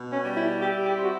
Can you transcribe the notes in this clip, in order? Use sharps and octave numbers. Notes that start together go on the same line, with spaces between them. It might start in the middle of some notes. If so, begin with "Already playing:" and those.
Already playing: B2
C#4
G3
E4
E4 G4
G4
C4
F#4